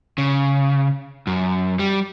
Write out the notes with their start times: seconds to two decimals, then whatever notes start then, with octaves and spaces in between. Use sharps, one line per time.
0.18 C#3
1.27 F#2
1.79 G3